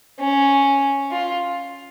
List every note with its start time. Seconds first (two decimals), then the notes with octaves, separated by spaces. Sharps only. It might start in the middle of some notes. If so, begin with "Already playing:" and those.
0.20 C#4
1.11 F4